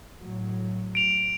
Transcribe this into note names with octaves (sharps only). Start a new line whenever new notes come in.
A2 F#3
D7 F7